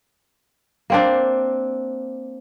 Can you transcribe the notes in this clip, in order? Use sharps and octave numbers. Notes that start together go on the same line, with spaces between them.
A#3 C4 D4